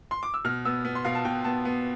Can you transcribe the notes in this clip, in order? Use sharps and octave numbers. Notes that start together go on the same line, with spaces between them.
C6
D6
E6
B2 F6
B3 E6
B3
C6
B2 F5
A5
B2 G5
B3 A5
B3